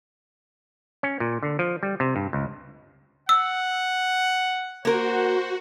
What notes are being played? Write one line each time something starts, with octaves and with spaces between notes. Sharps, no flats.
C#4
A#2
D3
F3
G3
C3
G2
C#2
F#5 E6
A#3 F#4 A#4 C5